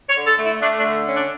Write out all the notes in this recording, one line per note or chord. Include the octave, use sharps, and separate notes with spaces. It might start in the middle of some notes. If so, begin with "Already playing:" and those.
C#5
D3
A4
A3
E4
A3 D4
D4
D3
C#4
D4